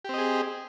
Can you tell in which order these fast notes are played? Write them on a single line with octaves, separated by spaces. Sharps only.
G4 C4 D#5 G#4